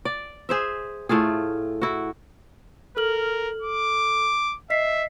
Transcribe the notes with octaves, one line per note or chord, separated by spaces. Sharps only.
D5
G#4 C5 E5
A2 A3 F4 G#4
E4 F#4
A4 A#4 F6 F#7
D6
D#5 E5 B6 C7